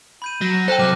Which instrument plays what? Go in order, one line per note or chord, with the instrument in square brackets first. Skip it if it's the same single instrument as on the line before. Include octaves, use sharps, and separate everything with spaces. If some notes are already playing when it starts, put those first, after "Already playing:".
[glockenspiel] B5 G6 D#7
[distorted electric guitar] F#3 [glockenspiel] A#6
[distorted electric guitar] A4 [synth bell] C5 G5 [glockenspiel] A5 F#6
[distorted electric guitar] C3 F#3 [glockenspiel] D6 F6 F#6